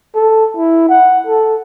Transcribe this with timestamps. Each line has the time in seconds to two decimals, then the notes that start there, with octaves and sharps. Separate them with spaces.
0.15 A4
0.57 E4
0.89 F#5
1.27 A4